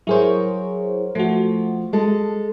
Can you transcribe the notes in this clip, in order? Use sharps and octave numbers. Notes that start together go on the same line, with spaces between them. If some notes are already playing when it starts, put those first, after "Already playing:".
F#3 E4 G#4 A#4 C5 C#5
F3 A3 F#4
G#3 A4